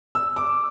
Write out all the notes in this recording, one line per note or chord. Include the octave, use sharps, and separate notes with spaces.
E6
D6